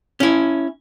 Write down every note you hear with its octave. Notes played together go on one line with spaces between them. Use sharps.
C#4 E4